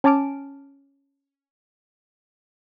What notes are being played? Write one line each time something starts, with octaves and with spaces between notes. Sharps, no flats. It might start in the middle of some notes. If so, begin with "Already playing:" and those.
C#4 G#5 A5 D6 F6 D7